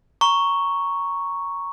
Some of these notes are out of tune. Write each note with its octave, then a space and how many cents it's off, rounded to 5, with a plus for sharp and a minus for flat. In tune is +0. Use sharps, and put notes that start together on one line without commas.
A#5 +0 C#6 +0